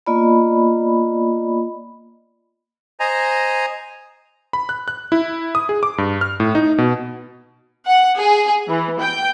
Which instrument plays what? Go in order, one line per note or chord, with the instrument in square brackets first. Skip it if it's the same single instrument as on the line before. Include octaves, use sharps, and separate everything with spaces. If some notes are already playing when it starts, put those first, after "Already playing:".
[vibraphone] A#3 B3 F4 D5 D#5 B5
[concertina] C5 D#5 G#5 A#5
[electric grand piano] B5
F#6
F#6
E4
D#6
G#4
D6
G2
F6
A2
D#4
B2
[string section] F#5
G#4
E3
G5